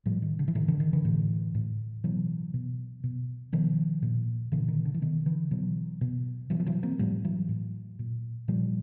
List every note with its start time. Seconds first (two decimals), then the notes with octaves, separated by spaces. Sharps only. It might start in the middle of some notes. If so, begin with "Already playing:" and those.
0.06 A2 F3 G3
0.22 D#3
0.39 D3
0.48 E3
0.55 A2 D#3
0.68 D3 E3
0.80 D#3
0.93 D3 E3
1.05 A2
1.55 A2
2.04 B2 E3 F#3
2.54 B2
3.04 B2
3.53 B2 D#3 F3
4.02 A#2
4.52 A#2 D3 E3
4.68 D#3
4.85 D3
4.94 E3
5.02 B2 D#3
5.26 D3 E3
5.51 B2 E3 F#3
6.01 B2
6.50 B2 E3 F#3
6.60 F3
6.66 E3 F#3
6.83 A#3 C4
6.99 A2 F3 G3
7.25 E3 F#3
7.49 A2
7.99 A#2
8.48 A#2 F3 G3